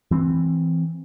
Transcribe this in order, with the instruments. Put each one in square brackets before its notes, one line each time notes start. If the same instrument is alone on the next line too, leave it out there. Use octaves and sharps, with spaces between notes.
[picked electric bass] E3 C4